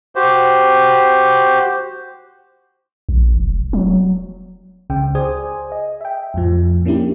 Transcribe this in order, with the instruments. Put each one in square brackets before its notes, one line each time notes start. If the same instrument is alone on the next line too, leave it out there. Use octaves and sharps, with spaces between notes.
[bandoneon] F#4 G4 C5
[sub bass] A#1
E1
F#3
[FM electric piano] C#2 C#3 G5
G#4 C5 D5 G#5 D#6
D#5
E5 G5
F2 A2 F3
A#3 C#4 D4 E4 G4